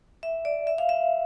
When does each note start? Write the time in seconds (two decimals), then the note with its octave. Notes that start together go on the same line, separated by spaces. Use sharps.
0.23 E5
0.45 D5
0.67 E5
0.78 F5
0.89 E5